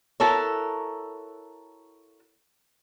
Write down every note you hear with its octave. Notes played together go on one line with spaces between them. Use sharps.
E4 F#4 A4 A#4 C#5